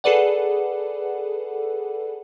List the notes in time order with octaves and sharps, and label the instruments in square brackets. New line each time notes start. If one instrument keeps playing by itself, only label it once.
[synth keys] G#4 A4 B4 D5 F#5